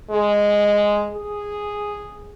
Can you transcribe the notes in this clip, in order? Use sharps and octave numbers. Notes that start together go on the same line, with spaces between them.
G#3
G#4